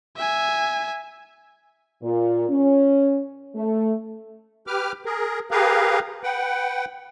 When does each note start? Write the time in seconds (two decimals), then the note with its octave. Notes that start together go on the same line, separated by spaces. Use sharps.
0.16 E5 G#5
2.02 A#2
2.49 C#4
3.55 A3
4.67 G4 B4 D6 F6
5.05 G#4 A#4
5.51 G4 G#4 A#4 B4 F5
6.24 B4 F#5 G5